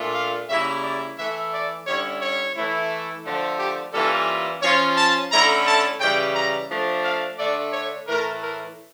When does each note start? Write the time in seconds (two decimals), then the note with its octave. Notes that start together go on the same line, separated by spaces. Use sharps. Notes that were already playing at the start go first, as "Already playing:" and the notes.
Already playing: A#2 A3 D4 F4
0.14 F5
0.49 C#3 G3 A#3 E4 E5
0.83 D5
1.17 E3 A3 E4 E5
1.53 D5
1.87 D3 G3 C#4 E4 C#5
2.21 C#5
2.56 E3 A3 E4
3.25 D3 F3 A3
3.59 G4
3.94 E3 G3 A#3 C#4 F4 A4
4.62 F3 C#4 F4 C#5
4.97 A5
5.31 D3 A3 C#4 E4 A#5
5.66 A5
6.00 C#3 E3 G3 G5
6.36 A#5
6.70 F3 A3 D4
7.04 F5
7.38 D3 A3 D4 D5
7.72 C#5
8.07 A2 E3 A3 A#4
8.42 A#4